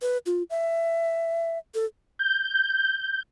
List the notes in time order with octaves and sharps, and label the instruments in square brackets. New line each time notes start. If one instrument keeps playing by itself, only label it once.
[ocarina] B4
F4
E5
A4
[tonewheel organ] G6